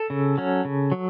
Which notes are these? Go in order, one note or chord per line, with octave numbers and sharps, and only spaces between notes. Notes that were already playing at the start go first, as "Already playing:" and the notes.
Already playing: A4
C#3
F#3 C#4
C#3
F#3